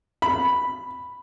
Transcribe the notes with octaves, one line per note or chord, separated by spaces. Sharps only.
B5